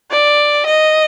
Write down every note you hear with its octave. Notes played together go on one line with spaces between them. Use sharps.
D5
D#5